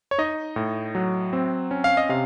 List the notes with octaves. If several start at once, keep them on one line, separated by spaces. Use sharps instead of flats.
C#5
D#4 D#5
A2
F#3
C4
C#4
F5
D#5
C3 F5